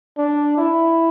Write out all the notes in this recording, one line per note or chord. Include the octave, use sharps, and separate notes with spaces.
D4
E4